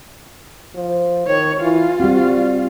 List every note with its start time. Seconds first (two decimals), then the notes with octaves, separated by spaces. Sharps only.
0.75 F3
1.27 D#3 C#5
1.60 E3 F4
2.00 G3 C4 F#4